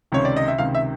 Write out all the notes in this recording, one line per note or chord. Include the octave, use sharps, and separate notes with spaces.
C#2 C3 D#3 C#5
D5
D#5
E5
C#2 C3 D#3 F5
E5